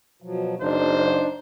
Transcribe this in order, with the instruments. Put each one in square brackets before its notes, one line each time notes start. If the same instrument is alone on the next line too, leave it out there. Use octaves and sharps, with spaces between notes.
[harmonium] B2 F3 F#3
[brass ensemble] F#1 C5 [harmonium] D4 D#4